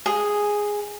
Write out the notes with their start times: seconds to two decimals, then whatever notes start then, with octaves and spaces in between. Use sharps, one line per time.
0.06 G#4